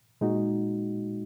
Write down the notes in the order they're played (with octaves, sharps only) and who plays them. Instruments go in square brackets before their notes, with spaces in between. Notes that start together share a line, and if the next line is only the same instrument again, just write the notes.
[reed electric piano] A#2 G#3 D#4 F#4